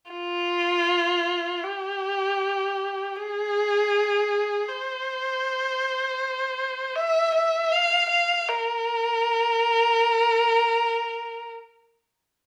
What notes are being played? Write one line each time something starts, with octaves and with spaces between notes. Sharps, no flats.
F4
G4
G#4
C5
E5
E5
F5
F5
A#4